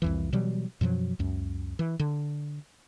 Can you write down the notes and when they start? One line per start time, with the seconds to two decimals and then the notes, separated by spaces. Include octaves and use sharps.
0.02 C2 F2 E3
0.33 B2 E3 F#3 G3
0.81 F#2 B2 F3 F#3
1.19 C#2 F#2
1.79 E3
1.99 D3